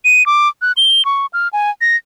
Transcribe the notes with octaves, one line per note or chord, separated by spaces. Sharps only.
D#7
D6
F#6
G7
C#6
F6
G#5
A#6